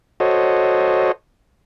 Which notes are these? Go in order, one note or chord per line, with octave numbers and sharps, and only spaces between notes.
F#4 A4 C5 C#5 D#5